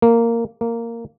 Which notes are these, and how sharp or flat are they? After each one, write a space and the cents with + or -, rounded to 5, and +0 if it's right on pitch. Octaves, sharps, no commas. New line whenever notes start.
A#3 -10
A#3 -10